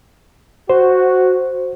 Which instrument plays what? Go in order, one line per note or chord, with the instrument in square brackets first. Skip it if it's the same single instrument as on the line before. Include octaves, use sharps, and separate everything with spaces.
[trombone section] F#4 [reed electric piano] C5